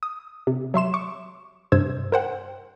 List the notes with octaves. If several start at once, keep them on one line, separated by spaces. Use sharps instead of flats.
D#6
C3
F#3 E5 C6 E7
C#6 D6
G2 C3 C5 E6 G#6
A#4 C5 F#5 G5